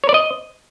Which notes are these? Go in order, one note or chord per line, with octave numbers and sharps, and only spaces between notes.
C#5
D5
D#5